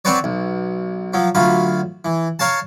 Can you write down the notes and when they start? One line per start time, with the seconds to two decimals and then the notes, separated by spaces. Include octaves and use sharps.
0.05 C4 F#4 B4 C#5 D5
0.24 B1
1.14 F3 F#3
1.35 D2 F#3 F4 B5
2.05 E3
2.39 A#4 C#5 F5 A5